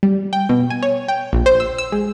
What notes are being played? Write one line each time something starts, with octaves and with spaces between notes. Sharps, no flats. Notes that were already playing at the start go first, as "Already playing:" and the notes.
G3
G5
B2
G#5
C#5
G5
A#1
C5
E6
E6
G#3